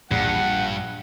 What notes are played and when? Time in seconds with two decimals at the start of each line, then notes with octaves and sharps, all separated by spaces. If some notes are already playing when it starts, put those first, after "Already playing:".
0.11 A#1 G2 F#5 C#7